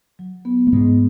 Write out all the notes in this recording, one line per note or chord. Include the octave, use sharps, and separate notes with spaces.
F#3
B3
A3
G#2 G#3 B3